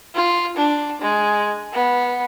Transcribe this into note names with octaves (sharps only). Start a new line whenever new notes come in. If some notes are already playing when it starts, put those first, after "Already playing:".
F4
D4
G#3
B3